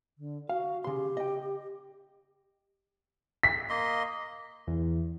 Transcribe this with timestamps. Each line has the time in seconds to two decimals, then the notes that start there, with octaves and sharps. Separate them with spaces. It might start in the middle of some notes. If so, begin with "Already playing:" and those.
0.18 D3
0.49 F#4 F5
0.84 C#3 G4 C6
1.17 D#5 G5
3.43 B6
3.70 A#3 D#5 C6
4.67 E2